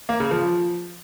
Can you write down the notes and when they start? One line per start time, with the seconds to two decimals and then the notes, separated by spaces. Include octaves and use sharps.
0.09 A#3
0.20 C#3
0.31 F3